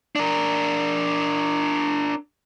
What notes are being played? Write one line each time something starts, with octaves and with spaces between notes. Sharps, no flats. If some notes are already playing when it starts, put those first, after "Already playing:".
D4 A#4